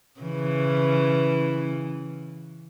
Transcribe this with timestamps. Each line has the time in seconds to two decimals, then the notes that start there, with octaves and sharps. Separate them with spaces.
0.20 C#3 E3